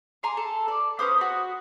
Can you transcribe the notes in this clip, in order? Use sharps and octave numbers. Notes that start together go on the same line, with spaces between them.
G#5 A#5 C6 D6
A4
D5
C#4 B4 C5 D#6
F#4 B5